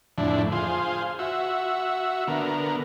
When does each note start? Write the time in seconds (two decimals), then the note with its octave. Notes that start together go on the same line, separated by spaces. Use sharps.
0.18 F2 A2 D3 D4 E4
0.52 F4 G#4 C5
1.19 F#4 E5
2.27 D3 B3 A#4